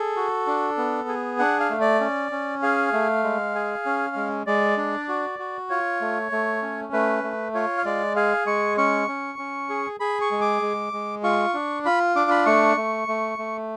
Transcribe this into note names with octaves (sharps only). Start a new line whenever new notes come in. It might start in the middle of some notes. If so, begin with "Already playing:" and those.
Already playing: G#4 A4
F#4
D4
B3
G#4
D4 F#5
F5
A3
D5
C#4
C#4
G#4 F5
A3
G#3
G#4
C#4
G#3
G#3 D5
D4
F#4
F#4
F4 C#5
A3
A3
C#4
A3 B4
A3
F4 C#5
F5
G#3 D5
G#4 F5
G#3 C#6
C#4 C#6
C#4
C#4
G#4
G#4 B5
C#6
G#3
D6
G#3
G#3
F4 C#6
D4
F4 B5
D4 D6
B5
A3 C#6
A3
A3
A3